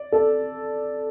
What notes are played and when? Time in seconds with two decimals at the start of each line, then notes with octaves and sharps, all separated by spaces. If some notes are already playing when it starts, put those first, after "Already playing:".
Already playing: D5
0.12 A4